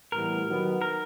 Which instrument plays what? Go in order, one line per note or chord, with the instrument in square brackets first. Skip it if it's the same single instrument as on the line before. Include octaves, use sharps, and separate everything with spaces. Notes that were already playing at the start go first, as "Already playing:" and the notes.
[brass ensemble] A2 E3 G3 B3 [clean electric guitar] A#4
[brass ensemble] D#3 F#3 B3
[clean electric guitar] A#4